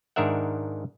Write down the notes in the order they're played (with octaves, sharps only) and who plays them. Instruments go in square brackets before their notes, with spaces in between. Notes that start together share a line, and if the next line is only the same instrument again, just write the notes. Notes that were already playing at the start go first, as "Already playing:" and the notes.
[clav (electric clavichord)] G#2 D#3 D4 A#4 E5 F#5